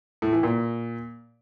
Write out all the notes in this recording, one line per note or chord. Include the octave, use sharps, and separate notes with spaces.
A2
E3
A#2